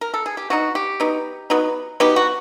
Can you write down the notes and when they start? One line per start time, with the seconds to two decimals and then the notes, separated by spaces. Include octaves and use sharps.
0.01 A#4
0.14 A4
0.26 G#4
0.37 G4
0.50 F#3 B3 D#4 F#4
0.75 G4
1.00 F#3 B3 D#4
1.50 F#3 B3 D#4
2.00 F#3 B3 D#4 G4
2.16 F#4